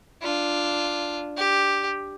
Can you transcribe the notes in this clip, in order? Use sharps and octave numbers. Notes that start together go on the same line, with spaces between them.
D4 F4
G4